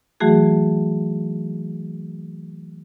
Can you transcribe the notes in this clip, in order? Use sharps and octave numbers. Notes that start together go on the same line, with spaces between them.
E3 F#3 A3 F#4 G#4